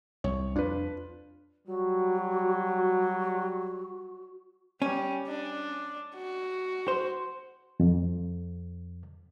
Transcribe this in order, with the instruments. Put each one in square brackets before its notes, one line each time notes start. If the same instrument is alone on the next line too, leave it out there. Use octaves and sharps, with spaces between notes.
[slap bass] C2 [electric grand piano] C#5
[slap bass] F2 [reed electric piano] D4 [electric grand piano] F4 B4
[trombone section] F#3 G3 [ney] F#4
[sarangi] G3 [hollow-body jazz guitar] C#4
[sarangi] D4
F#4
[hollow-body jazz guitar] C5
[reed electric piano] F2